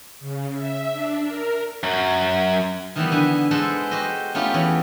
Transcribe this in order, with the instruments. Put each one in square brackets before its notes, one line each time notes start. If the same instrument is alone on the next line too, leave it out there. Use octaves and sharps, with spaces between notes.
[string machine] C#3
E5
D4
A#4
[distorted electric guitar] F#2 F#3
[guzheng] D#3 E3 G3 B3
D3 B4 G#5
G#3 B3 A4 B4 C5
F#4 G4 C5 D#5
A3 B3 C#4 F4 G4
E2 C#5